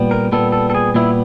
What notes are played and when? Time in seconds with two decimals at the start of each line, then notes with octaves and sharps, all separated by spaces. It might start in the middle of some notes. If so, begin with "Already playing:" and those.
Already playing: A#2 G3 B3
0.11 A#4
0.32 A#2 G3 B3 A4
0.52 A4
0.70 A4
0.75 G#4
0.94 A#2 G3 B3 E4